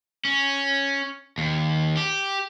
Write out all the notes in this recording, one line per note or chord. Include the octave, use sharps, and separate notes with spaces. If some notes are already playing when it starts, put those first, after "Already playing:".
C#4
D#2
G4